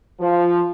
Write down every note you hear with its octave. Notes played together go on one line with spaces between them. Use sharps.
F3